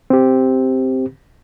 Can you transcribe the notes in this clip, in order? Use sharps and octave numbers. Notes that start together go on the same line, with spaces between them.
C4 G4